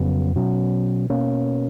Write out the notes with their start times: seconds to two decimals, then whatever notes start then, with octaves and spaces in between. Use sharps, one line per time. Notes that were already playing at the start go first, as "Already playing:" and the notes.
Already playing: F2 C#3 F#3 B3
0.35 B2 F#3 C#4
1.09 B2 A#3 C#4